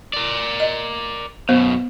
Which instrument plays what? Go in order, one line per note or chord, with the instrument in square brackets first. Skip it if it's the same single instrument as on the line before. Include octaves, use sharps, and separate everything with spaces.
[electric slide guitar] A#4 D5
[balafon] D#5
[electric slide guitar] F#2 B2 [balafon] B3 C5